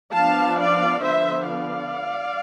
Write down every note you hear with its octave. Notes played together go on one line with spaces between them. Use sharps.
F3 B3 D4 F5 A5
D5 F5
D3 F3 B3 C5 E5
D5 F5